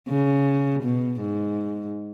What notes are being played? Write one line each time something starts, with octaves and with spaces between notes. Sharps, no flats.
C#3
B2
G#2